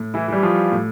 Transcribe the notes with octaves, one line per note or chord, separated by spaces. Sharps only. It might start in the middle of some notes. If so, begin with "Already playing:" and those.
Already playing: A2
E3 E4
E3 G3
F3 F4
A2